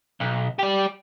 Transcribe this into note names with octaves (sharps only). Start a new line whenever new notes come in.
B1
G4 D5